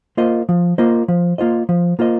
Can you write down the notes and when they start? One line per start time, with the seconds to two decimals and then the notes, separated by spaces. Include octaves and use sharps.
0.17 A#3 F4 C5 D#5
0.49 F3
0.78 A#3 F4 C5 D#5
1.08 F3
1.38 A#3 F4 C5 D#5
1.69 F3
1.99 A#3 F4 C5 D#5